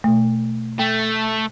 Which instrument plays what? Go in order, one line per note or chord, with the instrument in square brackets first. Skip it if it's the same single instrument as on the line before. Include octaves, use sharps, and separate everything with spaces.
[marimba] B2 A3
[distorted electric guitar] A3 [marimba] G5